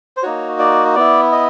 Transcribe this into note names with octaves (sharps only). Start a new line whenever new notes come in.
C5
A#3 D#4 F#4 C#5
D5
B3 E4 D5
D#5